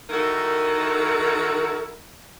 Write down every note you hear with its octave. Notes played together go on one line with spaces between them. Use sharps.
D#3 D#4 E4 F#4 A4 A#4